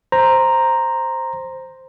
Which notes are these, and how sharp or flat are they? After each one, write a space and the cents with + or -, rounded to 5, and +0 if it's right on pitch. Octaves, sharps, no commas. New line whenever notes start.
C5 +0 A#5 +0